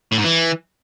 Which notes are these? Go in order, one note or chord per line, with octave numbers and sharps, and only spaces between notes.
A2
G#2
E3